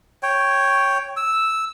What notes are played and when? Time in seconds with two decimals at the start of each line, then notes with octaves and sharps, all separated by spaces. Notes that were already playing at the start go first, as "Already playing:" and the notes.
0.23 C#5 G5
1.17 E6